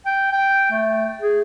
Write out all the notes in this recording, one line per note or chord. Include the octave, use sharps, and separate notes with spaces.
G5
G5
A3
G#4